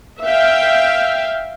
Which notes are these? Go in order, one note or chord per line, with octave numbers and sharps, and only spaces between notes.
E5 F5 G5